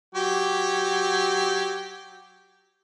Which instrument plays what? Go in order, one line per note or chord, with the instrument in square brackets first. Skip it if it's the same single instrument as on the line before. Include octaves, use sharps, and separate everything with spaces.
[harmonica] F#3 G4